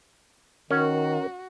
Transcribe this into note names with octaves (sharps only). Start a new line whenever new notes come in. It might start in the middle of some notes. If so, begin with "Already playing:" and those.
D#3 C#4 F#4 A#4